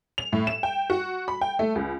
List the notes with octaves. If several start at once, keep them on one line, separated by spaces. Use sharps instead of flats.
F7
A2
E7
G5
F#4
B5
G5
A3
C#2